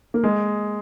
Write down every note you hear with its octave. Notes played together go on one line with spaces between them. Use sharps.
A#3
G#3